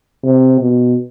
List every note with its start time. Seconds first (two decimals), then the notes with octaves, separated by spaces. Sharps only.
0.24 C3
0.61 B2